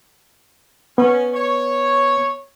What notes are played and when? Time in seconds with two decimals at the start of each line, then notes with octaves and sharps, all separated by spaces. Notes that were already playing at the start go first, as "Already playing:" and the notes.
0.98 B3 C#4
1.34 C#5